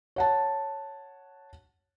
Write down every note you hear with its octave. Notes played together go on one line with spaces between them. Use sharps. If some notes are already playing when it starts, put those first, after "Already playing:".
C#5 F#5 A5